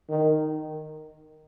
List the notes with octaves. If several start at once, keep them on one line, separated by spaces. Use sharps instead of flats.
D#3